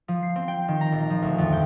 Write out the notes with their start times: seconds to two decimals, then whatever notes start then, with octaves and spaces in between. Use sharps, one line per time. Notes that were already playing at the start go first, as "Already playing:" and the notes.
0.08 F3
0.23 C7
0.36 C4
0.48 G5
0.68 D#3
0.81 A#5
0.92 A#1
1.10 F3
1.22 D2
1.38 F2
1.52 G5